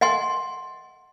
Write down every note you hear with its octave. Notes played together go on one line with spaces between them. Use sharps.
D#5 F#5 G#5 C6